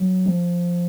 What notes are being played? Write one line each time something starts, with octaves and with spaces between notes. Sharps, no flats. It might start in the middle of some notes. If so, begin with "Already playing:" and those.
Already playing: F#3
F3